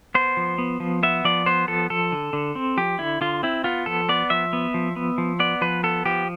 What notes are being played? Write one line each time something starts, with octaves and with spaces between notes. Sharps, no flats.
B3 C5
F3
B3
F3
B3 E5
F3 D5
B3 C5
F3 A4
F3 A4
D3
D3
C4
F3 G4
D3 E4
D3 F4
C4 E4
B3 F4
F3 A4
B3 D5
F3 E5
B3
F3
B3
F3
B3 D5
F3 B4
B3 A4
F3 G4